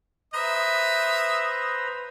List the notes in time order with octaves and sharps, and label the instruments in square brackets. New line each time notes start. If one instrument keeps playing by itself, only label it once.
[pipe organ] B4 C5 A#5 [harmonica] E5 D#6